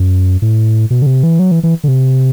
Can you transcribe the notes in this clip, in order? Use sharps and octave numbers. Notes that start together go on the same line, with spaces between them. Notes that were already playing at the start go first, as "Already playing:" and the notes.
Already playing: F#2
A2
B2
D3
C3
E3
F#3
E3
E3
D3
C3